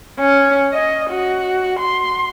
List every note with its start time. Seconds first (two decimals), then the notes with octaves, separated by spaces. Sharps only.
0.20 C#4
0.73 D#5
1.10 F#4
1.79 C6